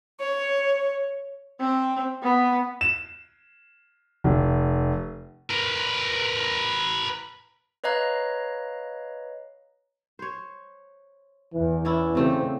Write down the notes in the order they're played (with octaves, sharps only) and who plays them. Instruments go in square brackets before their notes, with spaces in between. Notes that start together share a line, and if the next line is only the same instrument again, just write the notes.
[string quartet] C#5
[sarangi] C4
B3
[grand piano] E7
F1
[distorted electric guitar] A#4 B4
[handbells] B4 C#5 D#5 F5 A#5 F#6
[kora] C5 C#5
[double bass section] E2 [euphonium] E3
[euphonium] E3 [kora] C#4 D4 E4
[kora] A2 A3 G4 [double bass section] C#3 C4